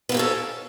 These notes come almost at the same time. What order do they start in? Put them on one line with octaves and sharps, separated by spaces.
B3 A#3 G4 C#4 A4